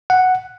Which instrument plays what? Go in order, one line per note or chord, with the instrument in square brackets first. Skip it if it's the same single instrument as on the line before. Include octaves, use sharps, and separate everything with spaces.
[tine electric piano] F#5